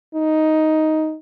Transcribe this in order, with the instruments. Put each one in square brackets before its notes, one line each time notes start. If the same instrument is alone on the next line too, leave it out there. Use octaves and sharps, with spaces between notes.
[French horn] D#4